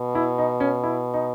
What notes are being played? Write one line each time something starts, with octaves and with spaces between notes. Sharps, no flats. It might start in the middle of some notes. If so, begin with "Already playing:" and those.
Already playing: B2
E4
D#4
C#4
E4
D#4